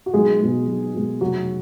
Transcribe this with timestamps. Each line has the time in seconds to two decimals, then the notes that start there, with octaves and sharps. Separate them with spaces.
0.06 F#4
0.14 B1 G#3 G#4
0.41 B2 G#3
0.67 B1
0.94 B2 G#3
1.21 F1 F#3 F#4